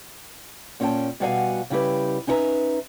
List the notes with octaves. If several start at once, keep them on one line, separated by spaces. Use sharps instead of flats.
A#2 C#4 E4 F4 G5 A5
B2 G3 F#4 D5 F5 G#5
C#3 G3 E4 G4 B4
C#4 D#4 E4 B4 E5 A#5